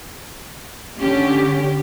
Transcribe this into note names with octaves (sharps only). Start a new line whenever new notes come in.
D3 C#4 G4